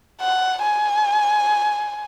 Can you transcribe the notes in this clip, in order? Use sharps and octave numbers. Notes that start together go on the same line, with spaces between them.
F#5
G#5